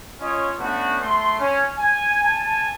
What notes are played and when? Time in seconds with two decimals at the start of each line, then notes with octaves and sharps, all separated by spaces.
0.20 C#4 F4 C#5 D#5
0.59 A3 B3 C#4 D4 F#4
1.00 A3 C6
1.39 C#4
1.78 G#5
2.23 G#5 A5